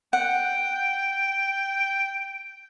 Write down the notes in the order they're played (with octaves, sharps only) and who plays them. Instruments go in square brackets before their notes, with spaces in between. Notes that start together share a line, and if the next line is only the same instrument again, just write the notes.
[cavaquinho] F#5 [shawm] G5